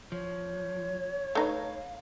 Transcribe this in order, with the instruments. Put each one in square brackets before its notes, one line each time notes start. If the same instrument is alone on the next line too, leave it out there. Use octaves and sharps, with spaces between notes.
[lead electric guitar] F3 [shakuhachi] C#5
[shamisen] A3 D#4 B4 [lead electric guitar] F5